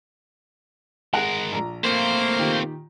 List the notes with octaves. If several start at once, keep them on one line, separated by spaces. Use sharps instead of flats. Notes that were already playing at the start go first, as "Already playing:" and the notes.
G#3 G#4 A#4 F#5
A#1 A#5
A3 A#3 C4 C5
A#2 D#3 G4